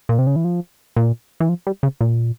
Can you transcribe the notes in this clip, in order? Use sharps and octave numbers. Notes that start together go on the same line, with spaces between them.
A#2
C3
C#3
E3
F3
A#2
E3
F3
G3
C#3
A#2